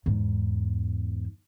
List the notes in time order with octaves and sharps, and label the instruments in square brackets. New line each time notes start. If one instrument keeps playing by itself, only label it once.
[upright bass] E2 G#2